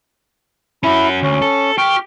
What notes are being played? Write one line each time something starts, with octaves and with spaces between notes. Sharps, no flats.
C#4 E4 F#4
D2 C#4
A4
G4 C#6 F6